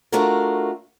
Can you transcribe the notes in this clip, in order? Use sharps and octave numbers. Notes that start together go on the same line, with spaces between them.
A3 D4 F4 F#4 A#4